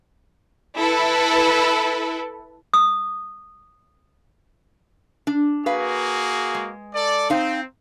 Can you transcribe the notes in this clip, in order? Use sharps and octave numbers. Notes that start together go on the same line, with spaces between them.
E4 A4 B4
D#6
D4
A#3 F#4 G#4 B4 F5
G#3
A4 D5
C4 D#4 F5